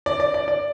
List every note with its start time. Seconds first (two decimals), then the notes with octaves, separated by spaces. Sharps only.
0.06 D5
0.20 D5
0.34 D5
0.48 D5